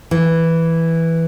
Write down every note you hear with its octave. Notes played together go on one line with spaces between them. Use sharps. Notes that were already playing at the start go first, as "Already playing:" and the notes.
E3